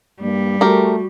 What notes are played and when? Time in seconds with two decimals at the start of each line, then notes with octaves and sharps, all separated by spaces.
0.21 G2 G3 A#3
0.61 A3 F#4 G4 A#4